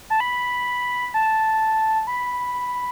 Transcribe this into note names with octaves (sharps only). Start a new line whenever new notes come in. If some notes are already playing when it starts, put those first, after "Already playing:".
A5
B5
A5
B5